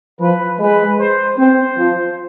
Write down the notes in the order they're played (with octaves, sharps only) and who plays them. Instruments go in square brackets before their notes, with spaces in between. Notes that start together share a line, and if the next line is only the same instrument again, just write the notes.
[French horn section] F3 [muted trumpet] B4
[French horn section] G#3 [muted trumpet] B4
[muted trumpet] C5
[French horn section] C4 [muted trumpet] C5
[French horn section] F3